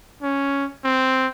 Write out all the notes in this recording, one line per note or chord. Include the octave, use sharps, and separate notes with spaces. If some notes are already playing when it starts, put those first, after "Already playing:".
C#4
C4